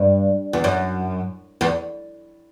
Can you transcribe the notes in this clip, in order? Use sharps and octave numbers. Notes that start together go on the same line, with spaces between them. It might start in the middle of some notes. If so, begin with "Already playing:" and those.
Already playing: G2
E2
F#2
E2